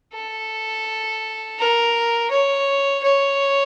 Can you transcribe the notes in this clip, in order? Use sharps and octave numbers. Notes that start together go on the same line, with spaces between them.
A4
A#4
C#5
C#5